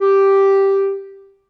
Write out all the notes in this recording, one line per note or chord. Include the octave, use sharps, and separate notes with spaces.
G4